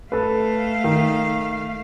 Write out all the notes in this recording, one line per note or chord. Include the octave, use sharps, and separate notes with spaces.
A3 A4 B4 F5
D#3